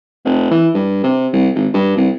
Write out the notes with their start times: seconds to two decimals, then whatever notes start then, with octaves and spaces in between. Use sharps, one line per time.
0.25 F1
0.51 E3
0.74 G2
1.04 C3
1.33 C2
1.55 G#1
1.74 G2
1.97 C2